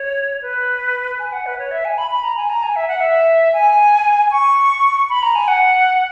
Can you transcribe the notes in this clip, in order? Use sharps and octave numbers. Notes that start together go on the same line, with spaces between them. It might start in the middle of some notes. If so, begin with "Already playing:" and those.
Already playing: C#5
B4
G#5
F#5
B4
C#5
E5
G#5
B5
B5
A#5
G#5
A#5
G#5
E5
F#5
E5
G#5
C#6
B5
A#5
G#5
F#5